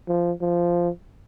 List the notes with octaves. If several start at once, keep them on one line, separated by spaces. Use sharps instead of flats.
F3
F3